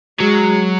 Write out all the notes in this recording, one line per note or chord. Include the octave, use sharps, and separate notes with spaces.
F#3 G#3